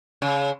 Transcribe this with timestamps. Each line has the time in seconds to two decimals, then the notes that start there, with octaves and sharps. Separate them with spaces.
0.22 C#3